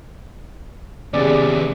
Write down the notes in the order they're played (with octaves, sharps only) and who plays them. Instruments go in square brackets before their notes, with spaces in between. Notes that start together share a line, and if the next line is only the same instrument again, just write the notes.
[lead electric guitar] D#2 B3 [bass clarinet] C3 [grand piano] C#4 G#4 [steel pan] D5